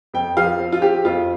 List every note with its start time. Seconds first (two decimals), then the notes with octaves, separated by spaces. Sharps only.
0.14 F2 G5
0.37 F3 F5
0.59 C4
0.72 F4
0.82 C4 G4
1.05 F2 F4